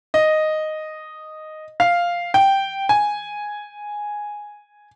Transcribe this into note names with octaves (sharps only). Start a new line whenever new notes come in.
D#5
F5
G5
G#5